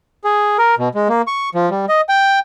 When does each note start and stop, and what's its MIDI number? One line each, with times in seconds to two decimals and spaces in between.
0.24 0.57 68
0.58 0.75 70
0.78 0.89 47
0.95 1.08 56
1.09 1.22 58
1.27 1.49 85
1.55 1.69 53
1.70 1.85 55
1.89 2.01 75
2.09 2.39 79